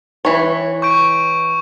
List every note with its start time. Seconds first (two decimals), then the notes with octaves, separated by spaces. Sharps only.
0.25 E3 C#5
0.82 C#6 G6 D7